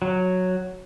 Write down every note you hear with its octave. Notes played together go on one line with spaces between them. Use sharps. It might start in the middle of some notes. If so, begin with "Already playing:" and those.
F#3